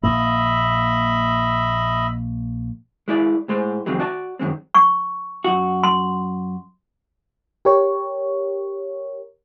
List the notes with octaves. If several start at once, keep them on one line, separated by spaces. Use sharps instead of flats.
A#1 A#2 A#3 D#5 E5 B5
G#3 E4 D5
A2 G#3 C5
F2 C3 D#3 F#3 G#3
F#4 D5 A5
F#2 D#3 G#3 C4
C#6
F#2 F#4
C6
G4 A#4 C#5